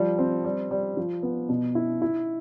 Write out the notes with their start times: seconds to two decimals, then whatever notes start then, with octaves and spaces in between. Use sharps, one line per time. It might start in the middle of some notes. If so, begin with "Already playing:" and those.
Already playing: F3 G3
0.18 C4
0.44 G3
0.71 G3
0.97 F3
1.23 B3
1.49 B2
1.75 E4
2.02 E4